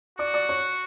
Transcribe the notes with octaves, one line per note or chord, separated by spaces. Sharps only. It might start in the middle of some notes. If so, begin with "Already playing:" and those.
F#4 D5 D6
D5 D6
C#5 C#6